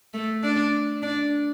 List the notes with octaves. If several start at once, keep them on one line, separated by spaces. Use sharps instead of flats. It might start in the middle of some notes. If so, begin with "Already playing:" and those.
A3
D4
D4